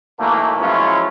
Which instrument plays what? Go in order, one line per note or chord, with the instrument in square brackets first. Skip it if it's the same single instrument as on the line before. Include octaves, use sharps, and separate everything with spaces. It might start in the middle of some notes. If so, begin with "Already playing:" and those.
[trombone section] B1 E3 A3 A#3
F3 F#3 G#3 C#4 E4 F4